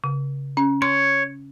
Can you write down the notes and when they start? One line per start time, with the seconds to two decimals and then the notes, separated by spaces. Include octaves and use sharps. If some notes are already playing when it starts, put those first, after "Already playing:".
0.04 C#3
0.57 C#4
0.82 C#5 C6